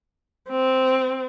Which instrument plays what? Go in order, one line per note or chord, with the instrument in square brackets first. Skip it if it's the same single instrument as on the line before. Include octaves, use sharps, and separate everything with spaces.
[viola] C4